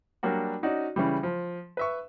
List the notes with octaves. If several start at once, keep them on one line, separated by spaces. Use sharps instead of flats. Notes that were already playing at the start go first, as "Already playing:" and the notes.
F#3 G3 A#3 D4 F#4
C#4 D#4 F#4 D5
C#3 E3 G3
F3
B4 E5 C#6